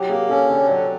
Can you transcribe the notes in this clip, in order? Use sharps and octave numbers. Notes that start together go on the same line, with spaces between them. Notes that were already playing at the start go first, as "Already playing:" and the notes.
Already playing: F#3 G4
A#3 G#4
C#4 A4
D3 C#5
F#3 C#5